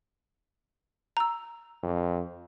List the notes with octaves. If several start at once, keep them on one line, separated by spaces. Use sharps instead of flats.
A#5 E6
F2